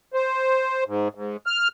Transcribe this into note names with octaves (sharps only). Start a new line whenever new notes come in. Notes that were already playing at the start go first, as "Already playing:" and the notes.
C5
G#2
G#2
F6